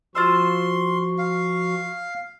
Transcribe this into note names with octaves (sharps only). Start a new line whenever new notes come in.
F3 F4 F#4 C5 C6 C#6 E6
F5